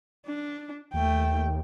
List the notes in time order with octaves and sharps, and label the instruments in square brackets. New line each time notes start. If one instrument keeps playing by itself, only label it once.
[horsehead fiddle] D4
[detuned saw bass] D#2 [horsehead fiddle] A3 G5